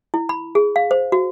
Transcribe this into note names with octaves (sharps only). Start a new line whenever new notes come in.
E4
B5
G#4
F5
C5
F#4